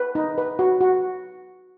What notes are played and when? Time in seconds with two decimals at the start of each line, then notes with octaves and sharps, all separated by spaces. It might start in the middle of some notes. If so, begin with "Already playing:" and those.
Already playing: B4
0.15 D#4
0.38 B4
0.59 F#4
0.81 F#4